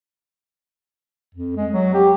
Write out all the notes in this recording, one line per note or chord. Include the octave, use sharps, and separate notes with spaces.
F2
G#3
F#3
G4